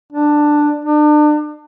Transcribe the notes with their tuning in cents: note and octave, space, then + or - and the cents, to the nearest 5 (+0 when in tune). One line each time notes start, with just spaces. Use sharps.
D4 +10
D4 +35